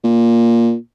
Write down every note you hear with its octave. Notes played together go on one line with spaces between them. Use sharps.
A#2